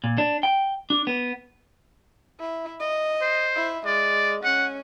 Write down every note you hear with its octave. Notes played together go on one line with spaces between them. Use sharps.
A#2
D4
G5
D4
B3
E4
D#5
C5
E4
G#3 D5
C#4 F#5